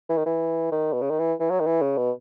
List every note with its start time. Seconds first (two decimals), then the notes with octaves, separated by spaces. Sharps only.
0.09 E3
0.17 D#3
0.26 E3
0.72 D#3
0.93 B2
1.02 C#3
1.10 D#3
1.19 E3
1.40 E3
1.50 F#3
1.60 D#3
1.66 E3
1.82 C#3
1.97 B2